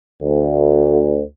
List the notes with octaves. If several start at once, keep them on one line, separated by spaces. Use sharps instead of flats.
D2